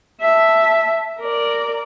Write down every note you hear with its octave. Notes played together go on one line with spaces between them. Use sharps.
E5 A5
A#4 D5